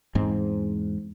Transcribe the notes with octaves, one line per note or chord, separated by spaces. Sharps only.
E2 G#2 C4